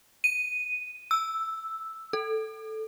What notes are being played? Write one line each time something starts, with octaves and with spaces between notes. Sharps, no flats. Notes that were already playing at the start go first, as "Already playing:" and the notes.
D#7
E6
A4